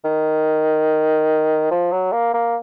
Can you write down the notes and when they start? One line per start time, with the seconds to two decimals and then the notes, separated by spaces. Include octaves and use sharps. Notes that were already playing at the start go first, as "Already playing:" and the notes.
0.04 D#3
1.71 F3
1.92 F#3
2.12 A#3
2.34 A#3